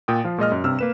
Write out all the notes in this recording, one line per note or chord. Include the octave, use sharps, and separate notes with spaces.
A#2 G5 D#6
F3 F4
A#2 G#3 D#5 F6
F#2
G2 C3 E6 F6
A#3 B4 E7